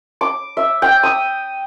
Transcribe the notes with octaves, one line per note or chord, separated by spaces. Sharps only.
D6
E5
G5
D#6